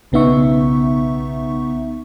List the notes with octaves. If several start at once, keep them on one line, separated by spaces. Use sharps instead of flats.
B1 C#3 B3 D#4 E5 C#6